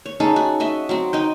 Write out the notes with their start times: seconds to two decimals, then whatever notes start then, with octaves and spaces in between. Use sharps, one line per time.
0.06 C#5
0.20 C#4 D#4 G#4 A4
0.36 F#4
0.60 F#4 D#5 E5
0.89 F#3 C4 F#4
1.13 D#4 D#5 G5